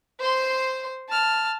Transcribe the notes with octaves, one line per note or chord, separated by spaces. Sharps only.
C5 C6
A5 F6